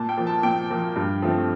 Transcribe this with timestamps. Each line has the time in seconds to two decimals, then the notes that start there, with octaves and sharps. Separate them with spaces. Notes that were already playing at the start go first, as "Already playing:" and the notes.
Already playing: A#2 A5
0.09 G5
0.17 F3 A#3
0.27 A5
0.43 A#2 G5
0.70 F3 A#3
0.96 G2
1.22 F3 A3 C4